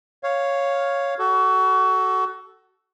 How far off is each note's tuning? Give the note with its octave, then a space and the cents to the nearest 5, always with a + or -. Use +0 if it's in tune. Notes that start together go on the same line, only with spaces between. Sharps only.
C#5 +0 F5 +0
F#4 +25 A4 -5